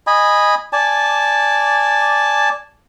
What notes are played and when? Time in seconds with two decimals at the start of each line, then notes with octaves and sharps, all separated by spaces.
0.07 D#5 G#5 B5
0.73 D5 G#5 A5